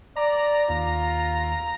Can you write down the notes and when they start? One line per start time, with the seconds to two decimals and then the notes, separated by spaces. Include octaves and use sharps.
0.16 D5 A#5
0.69 D#2 F4